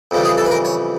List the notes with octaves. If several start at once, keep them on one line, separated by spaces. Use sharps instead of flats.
F2 C#3 E3 G3
G#4
A4
B4
A#4
C#5